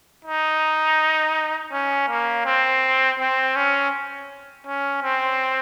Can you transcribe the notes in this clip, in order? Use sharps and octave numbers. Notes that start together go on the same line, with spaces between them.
D#4
C#4
A#3
C4
C4
C#4
C#4
C4